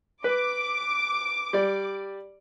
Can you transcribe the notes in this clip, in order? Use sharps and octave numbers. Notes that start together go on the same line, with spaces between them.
B4 D6
G3 D5